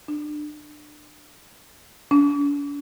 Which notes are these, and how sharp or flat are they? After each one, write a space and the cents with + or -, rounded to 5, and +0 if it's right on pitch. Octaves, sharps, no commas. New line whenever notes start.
D4 +30
D4 -45